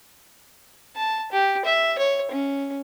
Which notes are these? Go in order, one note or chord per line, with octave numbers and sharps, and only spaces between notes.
A5
G4
E5
C#5
C#4